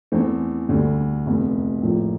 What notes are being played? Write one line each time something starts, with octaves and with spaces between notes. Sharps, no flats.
E2 E3 A3 C4
D2 D3 G3
F1 E2 C3
A#1 A2 F3 A#3